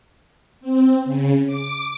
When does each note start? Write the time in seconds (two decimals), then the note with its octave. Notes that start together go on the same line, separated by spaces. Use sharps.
0.61 C4
1.05 C#3
1.47 D6